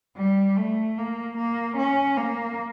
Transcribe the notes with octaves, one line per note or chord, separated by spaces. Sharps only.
G3
A3
A#3
A#3
C#4
A#3